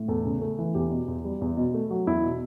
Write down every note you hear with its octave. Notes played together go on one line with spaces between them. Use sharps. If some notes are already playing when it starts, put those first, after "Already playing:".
Already playing: A2
E2 A4
C#3
A3
E3
E2 G4
B2
E2
G3
E2
B2
A3
F#3
E2 E4
B2